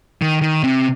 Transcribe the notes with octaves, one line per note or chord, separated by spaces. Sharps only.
D#3
D#3
C3